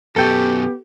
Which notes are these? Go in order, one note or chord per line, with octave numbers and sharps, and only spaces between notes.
F#2 B2 B3 G4 A4 G5